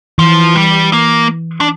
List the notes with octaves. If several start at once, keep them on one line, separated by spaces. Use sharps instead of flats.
E3 F3
G3
A#3
D4